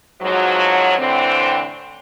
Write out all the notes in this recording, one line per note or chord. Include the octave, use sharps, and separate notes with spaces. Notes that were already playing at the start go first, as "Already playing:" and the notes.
F2 G#2 F3 F#3
A2 D3 E3 C4